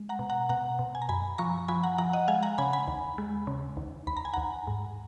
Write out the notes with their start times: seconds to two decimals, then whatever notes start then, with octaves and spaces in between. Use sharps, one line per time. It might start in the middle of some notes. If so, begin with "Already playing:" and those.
Already playing: G#3
0.09 F#5 A#5
0.19 B2
0.30 F#5 A#5
0.49 B2 F#5 A#5
0.79 B2
0.95 G#5
1.02 A#5
1.09 F#2 G#5 B5
1.38 F3 A#5 C#6
1.68 F3 G#5 B5
1.83 F#5 A#5
1.98 F3 F#5 A#5
2.13 D#5 F#5
2.28 G#3 F5 G#5
2.43 F#5 A#5
2.58 C#3 G#5 B5
2.73 G#5 B5
2.88 D#2
3.18 G#3
3.47 C#3
3.77 D#2
4.07 D#2 B5
4.17 A#5
4.25 G#5
4.33 D#2 F#5 A#5
4.67 G#2